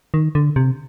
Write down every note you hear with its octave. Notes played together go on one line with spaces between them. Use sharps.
D#3
D3
C3